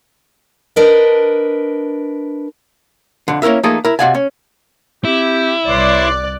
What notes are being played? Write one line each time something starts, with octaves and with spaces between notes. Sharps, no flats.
D4 A#4 B4 D#5
F2 D3
A#3 C#4 E4 A#4 E5
F3 A3 A#3 D#4 G#4 A4
E4 A#4
C3 F3 F#4 D5 F5 G#5
C#4
C4 E4 G4
C2 B4 C#5 D5 C6 F#6